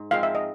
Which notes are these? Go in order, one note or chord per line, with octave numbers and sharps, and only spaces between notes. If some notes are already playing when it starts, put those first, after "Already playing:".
Already playing: G#2
F3 G#3 C4 F5
E5
D#5